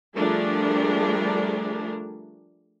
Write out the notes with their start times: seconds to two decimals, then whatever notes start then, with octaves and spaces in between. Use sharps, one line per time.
0.16 F3 G3 A3 D4 G#4 A#4